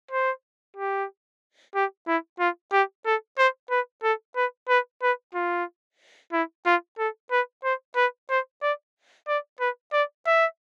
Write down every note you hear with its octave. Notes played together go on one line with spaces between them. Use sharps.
C5
G4
G4
E4
F4
G4
A4
C5
B4
A4
B4
B4
B4
F4
E4
F4
A4
B4
C5
B4
C5
D5
D5
B4
D5
E5